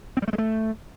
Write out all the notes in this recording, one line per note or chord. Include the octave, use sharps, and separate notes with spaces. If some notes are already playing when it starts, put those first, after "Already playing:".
C4
G3
A3
G#3
A3